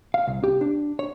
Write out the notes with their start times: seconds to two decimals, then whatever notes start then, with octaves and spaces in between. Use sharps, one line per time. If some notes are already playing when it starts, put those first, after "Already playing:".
0.14 F5
0.27 C2
0.44 G4
0.61 D4
0.99 C#5